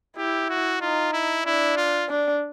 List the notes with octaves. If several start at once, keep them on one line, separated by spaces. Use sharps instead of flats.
E4 G4
F#4
D#4 F4
E4
D4 E4
F4
D4